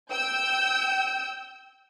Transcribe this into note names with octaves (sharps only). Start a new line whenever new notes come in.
G5 E6 G6